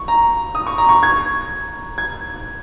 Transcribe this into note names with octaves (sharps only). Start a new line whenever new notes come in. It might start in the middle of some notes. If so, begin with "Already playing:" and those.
Already playing: C#6
A#5
D#6
C#6
A#5
C#6
G#6
G#6